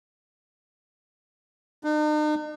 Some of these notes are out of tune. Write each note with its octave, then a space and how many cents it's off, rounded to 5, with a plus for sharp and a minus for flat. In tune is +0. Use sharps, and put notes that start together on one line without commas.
D#4 -45